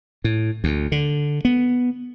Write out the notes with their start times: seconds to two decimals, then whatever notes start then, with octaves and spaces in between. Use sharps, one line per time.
0.24 A2
0.64 D2
0.92 D3
1.45 B3